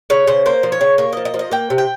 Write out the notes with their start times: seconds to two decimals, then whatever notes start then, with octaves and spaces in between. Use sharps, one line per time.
0.10 C#3 C#5
0.27 C#3 C5
0.46 A#3 C5
0.63 F3
0.72 C#5
0.81 C#3
0.98 A#3 C#5
1.13 D#5
1.17 F3
1.25 D#5
1.34 F3
1.39 D#5
1.51 A#3 G5
1.70 C3
1.78 G5